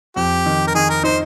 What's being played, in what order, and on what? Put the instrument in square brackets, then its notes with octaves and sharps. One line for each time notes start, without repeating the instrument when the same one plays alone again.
[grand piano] F2 [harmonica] G4
[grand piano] D#3
[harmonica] A#4
[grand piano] D#3 [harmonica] G#4
[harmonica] A#4
[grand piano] D#4 [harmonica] C5